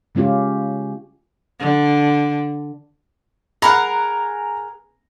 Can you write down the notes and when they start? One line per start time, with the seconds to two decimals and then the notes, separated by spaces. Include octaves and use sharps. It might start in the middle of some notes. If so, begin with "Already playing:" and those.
0.15 C#3 G#3 C#4 F4 G4
1.60 D3
3.62 G#4 A#4 F#5 A#5 B5